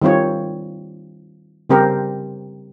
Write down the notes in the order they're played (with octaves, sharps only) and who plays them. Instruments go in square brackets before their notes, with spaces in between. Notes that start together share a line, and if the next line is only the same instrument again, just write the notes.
[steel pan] D#3 G3 C4 F4 C#5
C#3 G3 C4 G4 A#4 C5